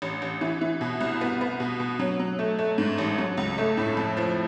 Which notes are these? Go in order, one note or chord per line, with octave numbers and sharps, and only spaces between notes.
A1
A1
E3
E3
B2
C2
B3
B3
B2
B2
F#3
F#3
A3
A3
G#2
A1
F#3
C#2
A3
A2
F2
F3